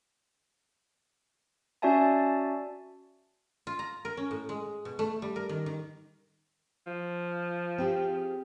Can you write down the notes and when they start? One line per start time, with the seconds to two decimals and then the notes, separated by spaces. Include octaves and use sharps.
1.82 C#4 F#4 D5 E5 G#5 A5
3.67 F4
3.79 A#5
4.05 A#4
4.17 C#4
4.31 A2
4.49 G#3
4.85 B2
4.99 A3
5.22 G3
5.36 A#4
5.49 D#3
5.66 D#3
6.87 F3
7.78 C4 G4 G#4